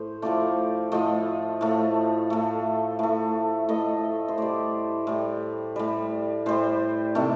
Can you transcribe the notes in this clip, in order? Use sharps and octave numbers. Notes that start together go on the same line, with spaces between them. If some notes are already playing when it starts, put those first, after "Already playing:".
Already playing: A2 C5
A2 F3 A3 D5
A2 F3 A3 D#5
A2 A3
A2 A3
A2 A3
A2 A3 D#5
C5
A2 G3 D5
A2 G3
A2 G3
A2 G3 C5
C3 D#3 A3